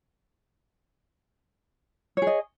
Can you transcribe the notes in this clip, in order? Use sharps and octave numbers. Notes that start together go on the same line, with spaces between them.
G#4 C#5 D#5